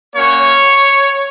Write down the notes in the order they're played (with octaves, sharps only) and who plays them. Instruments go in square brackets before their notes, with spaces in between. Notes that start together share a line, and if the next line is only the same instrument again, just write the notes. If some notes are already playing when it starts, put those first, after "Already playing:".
[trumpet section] A#3 C#4 F#4 C#5